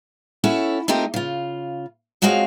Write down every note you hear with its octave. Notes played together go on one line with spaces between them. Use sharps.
C#4 E4 F#4 A4 C#5
A3 C4 D#4 F4 G4 A#4
C#3 F4
F3 G#3 C4 F#4 C#5 F5